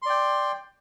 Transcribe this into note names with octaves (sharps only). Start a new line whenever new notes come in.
D5 G5 C6